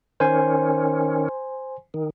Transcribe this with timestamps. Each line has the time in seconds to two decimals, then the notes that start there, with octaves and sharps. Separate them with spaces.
0.20 D#3 C#4 C5 G#5 C6
1.94 D#3